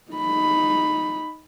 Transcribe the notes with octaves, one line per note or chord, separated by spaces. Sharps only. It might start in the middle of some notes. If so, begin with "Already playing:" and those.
D#4 B5